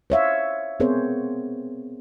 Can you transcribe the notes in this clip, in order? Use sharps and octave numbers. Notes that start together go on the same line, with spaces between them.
C5 C#5 E5 F5
B3 C4 G#4 A#4 C5 C#5